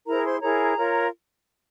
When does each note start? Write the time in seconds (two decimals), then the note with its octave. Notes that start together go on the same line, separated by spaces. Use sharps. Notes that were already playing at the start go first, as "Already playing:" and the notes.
0.07 E4 G#4 A#4 C5 A#5
0.24 C5 C6
0.41 E4 G#4 A#4 C#5 A#5
0.76 F4 A#4 C#5